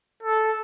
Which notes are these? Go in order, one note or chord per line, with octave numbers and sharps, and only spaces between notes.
A4